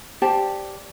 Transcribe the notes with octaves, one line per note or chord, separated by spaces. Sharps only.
G4 C5 D5 A5